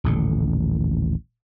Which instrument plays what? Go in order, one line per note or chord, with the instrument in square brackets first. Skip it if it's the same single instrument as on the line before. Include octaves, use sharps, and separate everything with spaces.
[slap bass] D#1 A1 D3